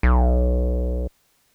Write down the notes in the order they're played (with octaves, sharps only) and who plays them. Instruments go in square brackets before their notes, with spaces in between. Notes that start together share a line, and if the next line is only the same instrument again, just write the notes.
[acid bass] B1